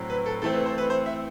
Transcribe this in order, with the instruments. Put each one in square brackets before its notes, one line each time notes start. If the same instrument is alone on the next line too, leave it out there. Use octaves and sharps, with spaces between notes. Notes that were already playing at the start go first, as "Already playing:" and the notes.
Already playing: [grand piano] A2 F#3 C4
B4
A4
E3 A3 C4 A4
B4
C5
B4
C5
E5